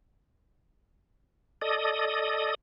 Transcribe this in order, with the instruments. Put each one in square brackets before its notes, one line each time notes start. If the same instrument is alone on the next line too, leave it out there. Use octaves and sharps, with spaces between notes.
[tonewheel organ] A4 D5 D#5 D#6